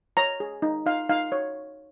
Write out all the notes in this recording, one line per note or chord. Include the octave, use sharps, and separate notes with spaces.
C#5 A#5
G#4
D#4
D#4 F5
D#4 F5
C#5